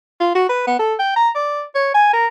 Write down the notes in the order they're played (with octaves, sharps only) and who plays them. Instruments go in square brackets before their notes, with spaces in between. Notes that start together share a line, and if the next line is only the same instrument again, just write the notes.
[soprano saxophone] F4
F#4
B4
B3
A4
G5
A#5
D5
C#5
G#5
A#4